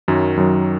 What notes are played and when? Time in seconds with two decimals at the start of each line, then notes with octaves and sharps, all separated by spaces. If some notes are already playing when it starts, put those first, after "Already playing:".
0.08 F#2 D#3 F#3
0.37 F#2 D#3 F#3